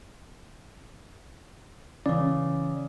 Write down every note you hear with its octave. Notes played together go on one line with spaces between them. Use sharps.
C#3 E3 D5